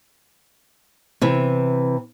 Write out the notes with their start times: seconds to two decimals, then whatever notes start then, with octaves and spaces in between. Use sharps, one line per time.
1.22 C3 E3